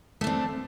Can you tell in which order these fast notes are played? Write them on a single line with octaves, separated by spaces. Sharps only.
A3 D4 C4